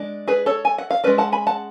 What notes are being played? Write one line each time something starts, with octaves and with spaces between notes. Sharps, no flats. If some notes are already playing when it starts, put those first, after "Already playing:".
Already playing: G#3 D4
G#4 B4
A4 C#5
G#5
F#5
F5
G#3 C#4 B4 D5
F#5 A5
G#5 B5
F#5 A5